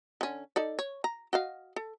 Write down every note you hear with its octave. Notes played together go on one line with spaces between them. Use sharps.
D3 C#4
D#4 A4 D5
C#5
A#5
F#4 D#5 F5
A4